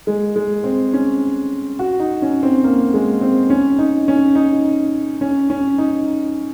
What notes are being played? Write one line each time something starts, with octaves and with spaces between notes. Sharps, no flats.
G#3
G#3
C4
C#4
F#4
D#4
C#4
C4
A#3
G#3
C4
C#4
D#4
C#4
D#4
C#4
C#4
D#4